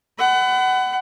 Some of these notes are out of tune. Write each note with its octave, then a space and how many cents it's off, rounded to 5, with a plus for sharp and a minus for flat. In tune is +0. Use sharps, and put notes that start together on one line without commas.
F#5 +25 B5 +30